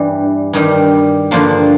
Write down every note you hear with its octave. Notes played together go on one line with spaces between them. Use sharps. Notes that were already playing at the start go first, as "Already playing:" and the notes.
Already playing: G2 E3 G3
G2 D#3 G3
G2 D3 F3 A#3